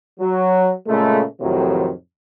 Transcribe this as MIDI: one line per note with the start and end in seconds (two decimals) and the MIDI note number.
0.20 0.72 54
0.88 1.22 46
0.88 1.22 49
0.88 1.22 56
0.88 1.22 57
1.41 1.90 41
1.41 1.90 45
1.41 1.90 48
1.41 1.90 51
1.41 1.90 53
1.41 1.90 54